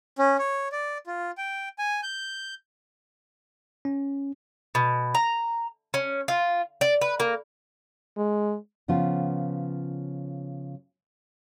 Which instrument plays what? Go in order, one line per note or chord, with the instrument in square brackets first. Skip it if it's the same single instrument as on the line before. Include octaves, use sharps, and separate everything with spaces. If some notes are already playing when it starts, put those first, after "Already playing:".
[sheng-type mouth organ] C#4
C#5
D5
F4
G5
G#5
G6
[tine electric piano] C#4
[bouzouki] B2
A#5
C#4
F4
D5
B4
A#3
[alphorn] G#3
[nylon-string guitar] C#3 F3 B3 F4